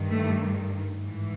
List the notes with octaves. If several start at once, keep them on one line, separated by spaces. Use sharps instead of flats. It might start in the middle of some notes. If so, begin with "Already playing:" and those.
Already playing: G2 D#3
A3
G#2 E3